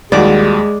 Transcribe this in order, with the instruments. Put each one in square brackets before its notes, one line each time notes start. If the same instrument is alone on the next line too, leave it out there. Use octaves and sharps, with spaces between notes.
[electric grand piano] D#2 G3 [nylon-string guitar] D#3 F4 F#4 [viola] G#3 [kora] D5